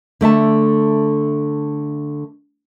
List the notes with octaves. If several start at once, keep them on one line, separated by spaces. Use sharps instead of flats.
D3 A3 E5 A5